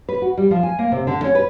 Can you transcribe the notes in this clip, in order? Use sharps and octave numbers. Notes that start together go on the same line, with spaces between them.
B4
F#4
G3
F3
G#5
A#3
C3
D3
C#4
B4